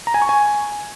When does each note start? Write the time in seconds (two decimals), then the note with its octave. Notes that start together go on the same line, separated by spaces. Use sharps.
0.07 A#5
0.14 G#5
0.22 C#6
0.29 G#5